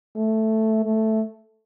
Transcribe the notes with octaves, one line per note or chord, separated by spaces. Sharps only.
A3
A3